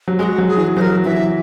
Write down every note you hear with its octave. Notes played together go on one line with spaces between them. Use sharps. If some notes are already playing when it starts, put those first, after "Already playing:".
F#3
G#3 G#4
F#4
F#3
G#4
E3
F#3 C5
A#4
E3 E5